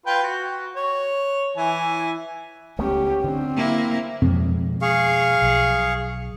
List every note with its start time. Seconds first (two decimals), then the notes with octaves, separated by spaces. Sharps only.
0.06 F4 B4 G5
0.24 F#4
0.76 C#5
1.57 E3 E4 G#5
2.79 C#2 A3 B3 C#4 G4
3.24 D3 C4 D4
3.56 A#3 E4
4.22 F2 B2 F3 G#3
4.82 G#4 F5 C#6
5.42 B1